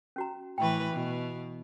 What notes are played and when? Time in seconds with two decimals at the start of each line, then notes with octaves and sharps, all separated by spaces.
0.16 C#4 F#4 A#5
0.58 A2 E3 B4 G5 B5 C#6
0.91 B2